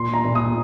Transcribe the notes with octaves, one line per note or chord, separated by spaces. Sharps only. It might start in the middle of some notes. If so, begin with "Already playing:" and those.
Already playing: A#2 C6
A#5
A#2
D#6